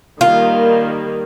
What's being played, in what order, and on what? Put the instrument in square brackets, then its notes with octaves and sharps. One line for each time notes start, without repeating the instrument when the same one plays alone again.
[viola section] D#3 G3 A#3 [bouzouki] F4